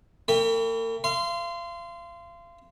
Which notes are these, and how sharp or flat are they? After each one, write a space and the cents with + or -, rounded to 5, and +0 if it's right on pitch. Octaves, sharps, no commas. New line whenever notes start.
A#3 -45 G5 +25 B5 +0
F5 -35 C6 -20